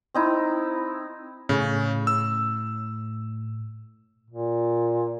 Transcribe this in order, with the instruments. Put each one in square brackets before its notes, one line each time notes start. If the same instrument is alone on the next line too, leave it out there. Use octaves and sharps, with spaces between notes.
[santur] C4 D#4 E4
[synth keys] A2 [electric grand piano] C#3
[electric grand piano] E6
[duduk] A#2